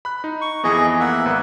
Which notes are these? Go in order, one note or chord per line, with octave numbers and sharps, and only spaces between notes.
B5 F#6
D#4
C#6
F2 E3 B3 G#4 D#5
A#3 E5 F#5
G#1 B4